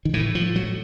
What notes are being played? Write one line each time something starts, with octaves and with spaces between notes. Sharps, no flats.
D#3
A2 E3
F3
F#3